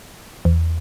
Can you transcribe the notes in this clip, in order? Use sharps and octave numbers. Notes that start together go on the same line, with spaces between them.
E2